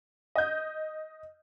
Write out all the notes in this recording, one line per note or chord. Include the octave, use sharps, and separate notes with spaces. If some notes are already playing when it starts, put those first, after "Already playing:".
D#5 G6